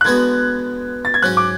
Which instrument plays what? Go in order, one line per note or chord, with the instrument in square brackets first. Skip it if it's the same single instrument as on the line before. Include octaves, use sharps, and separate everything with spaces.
[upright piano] F#6
[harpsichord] D3 G#3 B3 F#4 [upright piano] G#6
[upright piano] A6
G#6
[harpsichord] G#2 F#3 C#4 [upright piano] F#6
[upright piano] D6